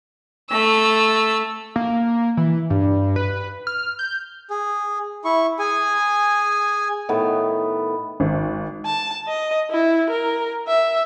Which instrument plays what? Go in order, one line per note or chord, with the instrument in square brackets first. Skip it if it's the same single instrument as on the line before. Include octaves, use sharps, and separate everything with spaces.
[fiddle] A3 E6
[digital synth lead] A#3
E3
G2
B4
F6
G6
[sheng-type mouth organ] G#4
E4 C#6
G#4 G#5
[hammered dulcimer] A2 D#3 B3
[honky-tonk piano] G#1
[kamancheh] A5
D#5
E4
A#4
E5